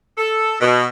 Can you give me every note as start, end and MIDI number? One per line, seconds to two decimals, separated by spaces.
0.18 0.56 69
0.60 0.86 47